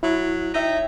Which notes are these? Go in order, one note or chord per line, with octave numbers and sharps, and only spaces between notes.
F#3 E4
D#4 C#5 E5 G5